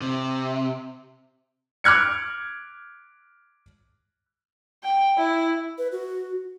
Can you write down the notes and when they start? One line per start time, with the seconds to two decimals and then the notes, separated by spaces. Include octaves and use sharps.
0.01 C3
1.84 D6 F6 F#6 G#6 C#7
4.84 G5
5.18 E4
5.78 B4
5.92 F#4